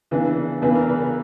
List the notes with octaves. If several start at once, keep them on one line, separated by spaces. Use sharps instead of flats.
C#3 E3 B3 D4
E2 C#3 E3 B3 D4 B4
A#4
B4